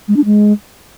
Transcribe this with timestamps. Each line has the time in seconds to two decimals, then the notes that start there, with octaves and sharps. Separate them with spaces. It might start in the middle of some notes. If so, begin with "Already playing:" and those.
0.08 G#3
0.17 D4
0.25 G#3